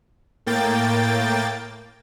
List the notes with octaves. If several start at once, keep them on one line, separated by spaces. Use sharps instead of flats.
A2 A#3 G5 A6